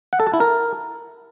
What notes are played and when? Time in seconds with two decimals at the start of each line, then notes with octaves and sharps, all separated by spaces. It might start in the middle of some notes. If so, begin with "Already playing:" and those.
0.13 F#5
0.20 A4
0.27 A5
0.33 E4
0.40 A#4